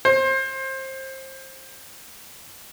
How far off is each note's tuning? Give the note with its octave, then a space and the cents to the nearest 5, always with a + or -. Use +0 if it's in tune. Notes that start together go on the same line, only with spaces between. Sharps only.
C5 +25